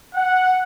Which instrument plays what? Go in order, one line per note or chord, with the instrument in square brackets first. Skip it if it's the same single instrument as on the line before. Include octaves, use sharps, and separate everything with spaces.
[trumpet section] F#5